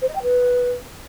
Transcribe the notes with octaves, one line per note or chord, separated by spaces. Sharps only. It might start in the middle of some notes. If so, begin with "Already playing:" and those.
C5
D#5
G5
B4